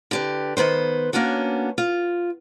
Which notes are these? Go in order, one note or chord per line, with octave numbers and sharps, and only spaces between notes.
D3 G4 B4
D#3 B3 B4 C5
A#3 B3 C#4 D4 F#4
F4